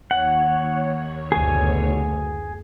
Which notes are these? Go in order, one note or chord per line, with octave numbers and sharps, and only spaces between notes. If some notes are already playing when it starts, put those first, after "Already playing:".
D#2 C#5 F#5
F#1 D2 B2 G#4 G#5